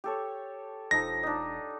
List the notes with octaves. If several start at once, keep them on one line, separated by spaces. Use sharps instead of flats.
G4 A4 C#5
E1 F3 D#4 A4 A#6
D4 D#4